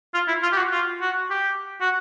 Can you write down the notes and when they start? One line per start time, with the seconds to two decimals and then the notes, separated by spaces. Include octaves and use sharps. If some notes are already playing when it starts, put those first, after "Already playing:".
0.14 F4
0.28 E4
0.43 F4
0.53 G4
0.57 F#4
0.72 F4
1.01 F#4
1.30 G4
1.81 F#4